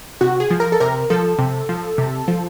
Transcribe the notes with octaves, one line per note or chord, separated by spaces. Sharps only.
C3 F#4
G#4
F3
A#4
A4
C3 A#4
F3 A4
C3
F3
C3
F3